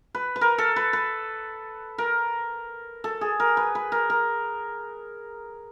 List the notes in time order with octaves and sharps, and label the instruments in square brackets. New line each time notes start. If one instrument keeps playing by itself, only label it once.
[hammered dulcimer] B4
B4
A#4
A4
B4
B4
A#4
A4
G#4
A#4
B4
B4
A#4
A#4